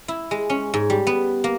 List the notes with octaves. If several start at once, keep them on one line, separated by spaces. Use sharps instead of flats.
E4
G#3
C#4
G#2
G3
B3
A#3